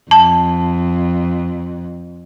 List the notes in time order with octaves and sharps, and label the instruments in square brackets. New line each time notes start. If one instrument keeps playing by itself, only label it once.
[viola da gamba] F2 [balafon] A5